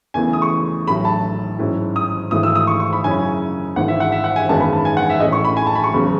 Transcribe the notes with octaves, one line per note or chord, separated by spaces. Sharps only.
E2 C#3 E3 A3 G#5
D#6
C#6
A1 A2 F#3 B5
A5
G#2 F#3 C#4 E4
D#6
G#1 G#2 E3 A3 E4 D#6
E6
D#6
C#6
C#6
B5
F#2 C#3 F#3 C#4 E4 G#5
G#1 G#2 E3 F#5
E5
F#5
E5
F#5
G#5
G#1 F#2 D#3 G#3 B3 A5
B5
A5
G#5
F#5
E5
A1 A2 E3 A3 C#4 D#5
C#6
B5
G#5
A5
B5
C#6
E1 D#2 C#3 F#3